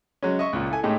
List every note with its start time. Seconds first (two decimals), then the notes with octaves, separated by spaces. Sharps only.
0.23 F#3 G#3 C#4
0.39 D#5 E5 C#6
0.53 C#2 A#2
0.70 E4 A4 G#5
0.83 A2 G#3 A3 D#4 G4 G#4